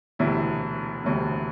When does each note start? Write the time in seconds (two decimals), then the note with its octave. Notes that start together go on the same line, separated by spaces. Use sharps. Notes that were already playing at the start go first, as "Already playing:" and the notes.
0.19 E1 D2 C3 E4
1.04 E1 D2 C3